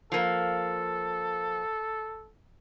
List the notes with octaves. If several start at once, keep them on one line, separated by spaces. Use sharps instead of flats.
F3 A#3 A4